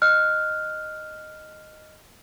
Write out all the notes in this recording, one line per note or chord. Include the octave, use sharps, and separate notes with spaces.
D#5 F6 F#6